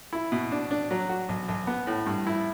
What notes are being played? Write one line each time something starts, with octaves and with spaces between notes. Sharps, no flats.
E4
B2
D4
D4
F#3
F#4
B1
B1
B3
A2
G2
E4